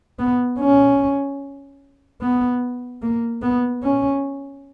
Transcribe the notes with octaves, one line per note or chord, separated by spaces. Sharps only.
B3
C#4
B3
A#3
B3
C#4